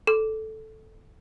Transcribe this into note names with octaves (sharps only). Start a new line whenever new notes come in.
A4